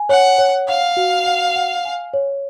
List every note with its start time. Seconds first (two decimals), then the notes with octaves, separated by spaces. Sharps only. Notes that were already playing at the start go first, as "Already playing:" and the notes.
Already playing: G#5
0.09 C#5 F#5
0.38 C#5
0.68 F5 F#5
0.97 F#4
1.26 F#5
1.56 F#5
1.85 G#5
2.14 C#5